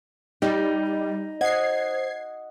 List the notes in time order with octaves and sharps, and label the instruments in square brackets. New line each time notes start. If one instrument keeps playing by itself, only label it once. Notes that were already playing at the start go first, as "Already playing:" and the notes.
[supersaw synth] G3 [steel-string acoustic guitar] D#4
[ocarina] D#5
[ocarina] C5 [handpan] D#5 F#5 [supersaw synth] G#6 C7